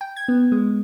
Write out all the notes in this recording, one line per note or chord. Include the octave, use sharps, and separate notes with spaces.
G5
G#6
B3
G#3